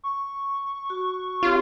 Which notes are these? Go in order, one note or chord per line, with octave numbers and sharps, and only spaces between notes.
C#6
F#4
C4 F4 G4 C#5